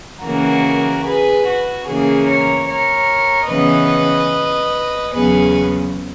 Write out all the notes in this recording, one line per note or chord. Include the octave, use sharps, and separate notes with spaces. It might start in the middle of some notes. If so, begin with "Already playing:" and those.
C#3 E3 A#3 F#4 A#4
G#4 B4
F#4
C#3 E3 A#3 G#4
A#4 C#5
A#4 C#5
C#3 E3 B3 B4 D#5
E2 C#3 F#3 B3 G#4 B4